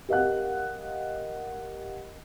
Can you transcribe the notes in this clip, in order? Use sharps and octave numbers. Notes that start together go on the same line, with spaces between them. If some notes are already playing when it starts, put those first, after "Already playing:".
G4 A#4 D#5 F5 F#5 F#6